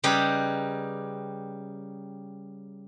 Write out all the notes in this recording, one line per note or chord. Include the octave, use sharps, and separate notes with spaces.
C#3 G3 D#4 G4 G#4 B4